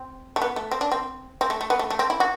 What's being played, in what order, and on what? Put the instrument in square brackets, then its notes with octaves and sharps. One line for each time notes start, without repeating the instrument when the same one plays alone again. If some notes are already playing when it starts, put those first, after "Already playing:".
Already playing: [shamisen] C4
A3
B3
A3
C4
D4
C4
C4
A3
A3
B3
A3
A3
C4
E4
F#4